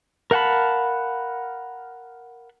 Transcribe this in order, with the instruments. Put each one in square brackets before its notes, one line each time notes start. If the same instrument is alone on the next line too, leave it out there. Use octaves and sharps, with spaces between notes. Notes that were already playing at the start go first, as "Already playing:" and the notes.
[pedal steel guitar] A#4 F5 F#5 A5 B5